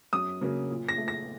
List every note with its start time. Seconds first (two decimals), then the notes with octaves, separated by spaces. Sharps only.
0.13 F#2 D#6
0.41 C#3 F#3 A#3
0.70 A#2
0.89 A#6
0.98 A3
1.08 A#6